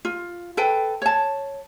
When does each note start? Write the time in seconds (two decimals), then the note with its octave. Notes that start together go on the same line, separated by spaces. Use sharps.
0.05 F4
0.57 A4 B4 G5
1.02 C#5 A5